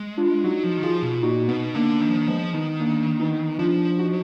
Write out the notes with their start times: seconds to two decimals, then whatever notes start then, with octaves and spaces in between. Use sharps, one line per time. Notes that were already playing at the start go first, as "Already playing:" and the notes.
Already playing: G#3
0.17 D4 F4
0.44 F#3 D#4 F#4
0.63 F3
0.77 D#3
0.83 F3 F4 G#4
1.03 B2
1.22 A#2 D#4 F#4
1.48 B2 B3 D#4
1.74 D3 A#3 D4
2.01 D#3 A#3 D4
2.09 F3
2.16 D#3
2.27 F3 G#3 B3
2.53 D#3 B3 D#4
2.80 A#3 D4
3.20 B3 D#4
3.58 F3 D4 F4
3.99 D#4 F#4